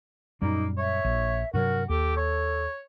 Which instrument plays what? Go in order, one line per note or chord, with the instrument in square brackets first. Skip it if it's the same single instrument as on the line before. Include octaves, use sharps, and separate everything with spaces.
[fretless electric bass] F#2 A#2 G3 [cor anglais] A#3 [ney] D#4
[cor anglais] C#5 [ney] E5
[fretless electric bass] A#1
[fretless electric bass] G2 C3 F#3 [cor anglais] F#4 [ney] A#4
[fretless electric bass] D#2 [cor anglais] G4 [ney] A4
[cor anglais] C#5